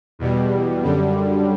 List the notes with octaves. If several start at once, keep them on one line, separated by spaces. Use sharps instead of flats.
E2 B2 G3
F#2 D3 G3